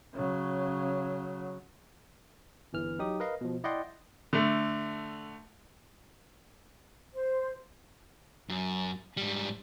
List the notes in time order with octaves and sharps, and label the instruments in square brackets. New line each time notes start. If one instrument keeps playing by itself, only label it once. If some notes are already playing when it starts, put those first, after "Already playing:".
[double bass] C#3 F#3
[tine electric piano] G1 E3 F6
F#3 D#4 G4 D#6
A#4 B4 D#5 F5
B2 F3
E4 D5 D#5 F#5 G5 C6
[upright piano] D3 A3
[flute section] C5
[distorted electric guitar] F#2
G#2 G3